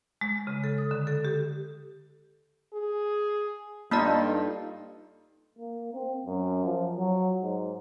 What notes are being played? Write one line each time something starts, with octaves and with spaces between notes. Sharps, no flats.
G#3
C#3
A4
D#6
D3
A4
G4
G#4
G2 A#3 D#4 F4 A4 D5
A#3
C4
F#2
F3
F#3
G#2